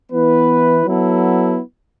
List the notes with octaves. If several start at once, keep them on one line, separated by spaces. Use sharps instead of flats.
E3 B3 E4 B4
F#3 B3 E4 A4